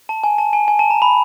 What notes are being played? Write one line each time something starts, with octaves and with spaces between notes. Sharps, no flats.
A5
G#5
A5
G#5
G#5
A5
A#5
B5